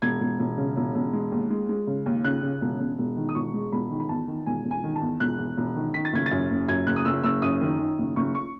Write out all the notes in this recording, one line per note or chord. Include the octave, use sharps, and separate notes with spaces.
E1 G#6
E1
E1
C#3
E1
E1
G#3
D#2
G#3
G#3
C#3
D#2
C#3 F#6
C#3
E1
E1
E1
D#3
D#6
E1 C#6
G#3
E1 B5
D#3
B5
E2 A5
D#3
E1 G#5
E1
G#5
D#3
A5
E2
E1 F#6
E2
E1
D#3
D#3 B6
A6
F#1 G#6
A6
F#2
F#1
F#2 G#6
F#1 F#6
D#6
F#1 E6
F#1 E6
F#2 D#6
D#3
D#3
F#1
F#1 C#6
C#6